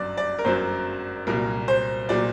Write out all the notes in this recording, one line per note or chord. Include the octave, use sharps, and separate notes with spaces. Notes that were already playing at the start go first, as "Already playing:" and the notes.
Already playing: G1 F#2 F#3 D5
D5
A#4
G1 F#2 F#3 C5
C2 A#2 F#3 A#4
C5
A#2 F#3 D5